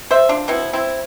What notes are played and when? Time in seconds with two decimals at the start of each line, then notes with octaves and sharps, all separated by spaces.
0.11 C5 E5
0.29 D4 F4
0.48 B2 B3 C4 E4
0.73 C4 E4